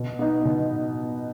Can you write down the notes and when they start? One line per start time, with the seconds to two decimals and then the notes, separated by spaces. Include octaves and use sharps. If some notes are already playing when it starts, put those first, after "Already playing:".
Already playing: B2
0.19 B3 D#4
0.45 B2